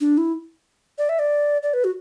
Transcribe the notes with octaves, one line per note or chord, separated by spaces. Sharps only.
D4
E4
D5
E5
D5
D5
B4
F#4